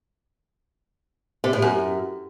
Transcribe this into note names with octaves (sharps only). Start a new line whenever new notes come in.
C3
A2
F#2